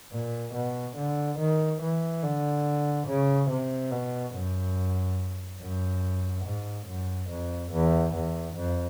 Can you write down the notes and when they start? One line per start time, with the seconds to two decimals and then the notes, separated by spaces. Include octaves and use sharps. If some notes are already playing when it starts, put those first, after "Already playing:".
0.12 A#2
0.54 B2
0.97 D3
1.39 D#3
1.81 E3
2.23 D3
3.07 C#3
3.50 C3
3.92 B2
4.35 F#2
5.61 F#2
6.45 G#2
6.87 F#2
7.30 F2
7.72 E2
8.14 E2
8.56 F2